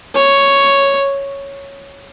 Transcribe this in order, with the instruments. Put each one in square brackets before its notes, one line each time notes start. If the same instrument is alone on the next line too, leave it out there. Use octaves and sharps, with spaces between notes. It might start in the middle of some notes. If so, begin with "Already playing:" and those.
[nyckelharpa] C#5